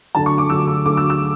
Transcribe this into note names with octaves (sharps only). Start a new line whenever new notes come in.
D2 D3 F#3 A5
C#6
D6
D2 D3 F#3 E6
D6
D2 D3 F#3 D6
E6
E6